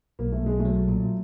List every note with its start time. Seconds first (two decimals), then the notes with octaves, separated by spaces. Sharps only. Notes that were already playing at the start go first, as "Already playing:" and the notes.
0.19 B1 A#3
0.32 A3
0.41 B1
0.46 G#3
0.59 A3
0.65 F#3
0.88 A#2